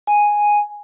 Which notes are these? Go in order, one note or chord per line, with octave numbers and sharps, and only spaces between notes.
G#5